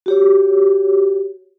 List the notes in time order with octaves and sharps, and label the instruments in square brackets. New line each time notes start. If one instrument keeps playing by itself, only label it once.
[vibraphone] F#4 G4 C#5